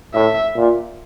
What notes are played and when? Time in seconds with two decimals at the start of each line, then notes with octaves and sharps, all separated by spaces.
0.14 A2 E5
0.56 A#2